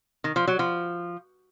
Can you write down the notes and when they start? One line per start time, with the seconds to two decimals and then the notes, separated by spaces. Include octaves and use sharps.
0.24 D#3
0.36 F3
0.48 F#3
0.59 F3